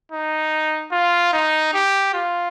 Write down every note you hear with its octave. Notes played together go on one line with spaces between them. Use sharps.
D#4
F4
D#4
G4
F4